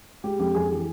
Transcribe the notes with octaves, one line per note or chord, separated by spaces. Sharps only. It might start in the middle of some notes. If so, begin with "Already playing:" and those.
G#3 G4
F2 G4
F2 G#4
E3